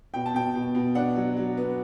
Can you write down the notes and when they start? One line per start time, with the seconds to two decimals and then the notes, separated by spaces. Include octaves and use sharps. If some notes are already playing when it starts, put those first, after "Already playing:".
0.14 B2 G5
0.26 A5
0.34 B2 G5
0.55 B2
0.75 B2
0.95 D4 F#5
1.16 F#3
1.37 F#3
1.57 B3